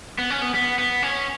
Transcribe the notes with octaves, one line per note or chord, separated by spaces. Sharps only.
B3
C#4
B3
B3
B3
C#4